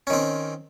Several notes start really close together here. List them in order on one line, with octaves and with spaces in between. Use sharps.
C#4 D#3 C4